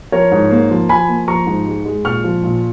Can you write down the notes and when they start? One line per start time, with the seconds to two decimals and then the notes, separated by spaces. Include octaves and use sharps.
0.12 F3 A#4 C#5
0.32 G#2
0.51 A#3
0.70 F3
0.89 F3 G#5 B5
1.09 A#3
1.28 F3 A#5 C#6
1.47 G#2
1.67 G#3
1.85 G#3
2.05 A#2 C#6 F6
2.24 F3
2.43 A#2